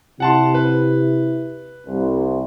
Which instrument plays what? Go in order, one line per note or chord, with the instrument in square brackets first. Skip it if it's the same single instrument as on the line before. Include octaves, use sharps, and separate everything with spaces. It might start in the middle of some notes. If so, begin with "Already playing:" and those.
[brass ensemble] C3 E4 [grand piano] F#5 A5 C6
[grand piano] B4
[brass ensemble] C2